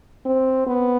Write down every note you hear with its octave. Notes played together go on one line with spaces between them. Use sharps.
C4
B3